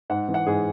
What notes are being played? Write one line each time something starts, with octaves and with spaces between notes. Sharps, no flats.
G#2 F#5
E3
F#5
G#2 G#4